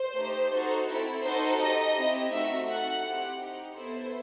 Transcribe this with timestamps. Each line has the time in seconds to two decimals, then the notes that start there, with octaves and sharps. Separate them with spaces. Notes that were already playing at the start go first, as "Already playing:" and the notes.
Already playing: C5
0.16 A3 D#4 G4
0.51 D#4 F#4 A4
0.87 C4 E4 A4
1.23 D#4 F#4 A4 C5
1.59 D#4 G4 D#5
1.95 C4 E4 G4
2.30 A3 C4 D#4 F#4 E5
2.67 D#4 F#4 A4 F#5
3.03 C4 E4 G4
3.40 D#4 G4
3.75 B3 E4 A4 C5